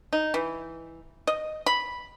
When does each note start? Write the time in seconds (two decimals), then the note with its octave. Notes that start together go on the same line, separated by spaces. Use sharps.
0.13 D#4
0.34 E3
1.27 D#5
1.66 B5